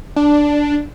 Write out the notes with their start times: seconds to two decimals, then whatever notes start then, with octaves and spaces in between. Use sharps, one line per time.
0.16 D4